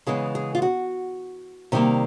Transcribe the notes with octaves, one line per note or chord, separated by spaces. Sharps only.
C#3 E3 G#3 B3 G#4
G#4
F4
F#4
C3 D#3 G3 A#3